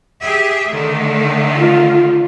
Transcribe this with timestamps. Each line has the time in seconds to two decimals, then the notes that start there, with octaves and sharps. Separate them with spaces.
0.22 G4 G#4 E5
0.70 D3 D#3 A3
1.57 F4